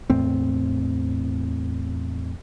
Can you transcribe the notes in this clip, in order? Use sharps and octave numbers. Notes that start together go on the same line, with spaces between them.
E2 A2 C4